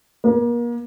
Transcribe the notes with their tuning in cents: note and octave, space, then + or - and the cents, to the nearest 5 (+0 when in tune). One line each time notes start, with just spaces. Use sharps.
A#3 +35